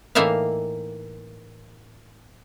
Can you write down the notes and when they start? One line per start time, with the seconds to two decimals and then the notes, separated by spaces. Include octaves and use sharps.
0.15 A2 E3 A#3 D#4 E5 F5